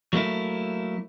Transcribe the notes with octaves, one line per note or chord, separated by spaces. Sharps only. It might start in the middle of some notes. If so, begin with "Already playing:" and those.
F#3 A3 A#3 E4